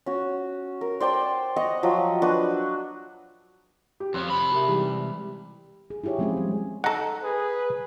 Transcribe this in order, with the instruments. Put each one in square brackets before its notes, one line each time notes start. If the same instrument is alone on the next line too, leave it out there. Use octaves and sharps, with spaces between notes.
[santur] C#4 F#4
A#4
C5 D5 G5 A5
D#5 F#5 A#5 C#6
F3 F#3 G5
D4 F#4 B4
[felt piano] G4
[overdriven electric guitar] F2 F3 [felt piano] C6 F#6
[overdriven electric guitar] C3 B5
[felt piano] G4 A#4 E5
E3 G3 G#3
[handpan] G#4
E4 F4 G4 G#4 C#5
F3 G#3 C4 C#4 F4 G#4
G3 C#4
[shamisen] D#4 A4 [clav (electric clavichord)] F#5 A#5
[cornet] G#4 [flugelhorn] B4